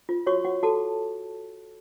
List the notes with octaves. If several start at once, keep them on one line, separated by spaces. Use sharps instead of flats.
F4
F#4 C#5 C#6
F#4 F#5
F#4 A4 A5